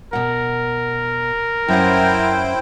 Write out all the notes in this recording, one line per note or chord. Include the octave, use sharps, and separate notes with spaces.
B2 A#4 F#5
F#2 C#4 E4 C5 F#5 G5